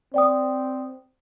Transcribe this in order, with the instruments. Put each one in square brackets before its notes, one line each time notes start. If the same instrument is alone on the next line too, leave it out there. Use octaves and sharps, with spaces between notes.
[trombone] C4 [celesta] D5 G5 D#6